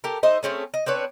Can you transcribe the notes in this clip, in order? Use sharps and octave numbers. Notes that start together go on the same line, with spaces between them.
G4 A4 A#4
D#4 C5 D#5 E5
A3 C4 C#4 G#4
D#5
C4 D4 B4 C#5